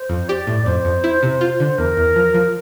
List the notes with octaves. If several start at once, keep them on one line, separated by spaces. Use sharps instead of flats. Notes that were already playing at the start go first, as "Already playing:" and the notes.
Already playing: C5
F2
G4 D5
A2
F2 C5
F2
E4
C3
F4
D3
E2 A#4
E2
F3
F3